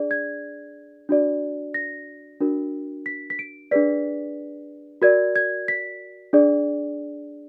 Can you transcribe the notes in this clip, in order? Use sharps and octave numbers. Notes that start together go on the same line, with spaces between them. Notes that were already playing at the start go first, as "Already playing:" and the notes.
Already playing: D4 G#4 D5
G#6
D4 F#4 D5
A#6
D4 F#4 A#4
B6
B6
D7
D4 G#4 B4 D5 B6
F#4 A#4 D5 G#6
G#6
B6
D4 G#4 D5